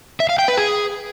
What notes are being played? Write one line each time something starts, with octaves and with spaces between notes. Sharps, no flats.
E5
F5
G5
B4
G#4